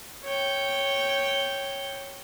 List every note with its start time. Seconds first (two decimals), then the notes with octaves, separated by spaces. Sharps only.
0.24 C#5 G5